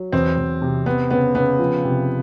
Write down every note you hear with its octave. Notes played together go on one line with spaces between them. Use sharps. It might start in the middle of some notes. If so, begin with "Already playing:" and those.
Already playing: F#3
E2 C4
E2
C3
B3 C4
C#3 B3
C#3 B3
F3
C3